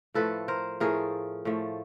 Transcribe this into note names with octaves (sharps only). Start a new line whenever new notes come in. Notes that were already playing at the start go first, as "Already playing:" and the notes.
A2 F3 A3 A4 B4
A#4 C5
A2 F3 A3 G#4 A#4
A2 F3 A3